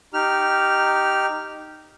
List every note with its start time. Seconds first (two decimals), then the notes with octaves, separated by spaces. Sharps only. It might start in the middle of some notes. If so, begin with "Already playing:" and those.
0.14 D#4 G4 F6